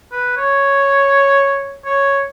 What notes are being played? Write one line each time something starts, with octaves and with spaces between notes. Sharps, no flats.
B4
C#5
C#5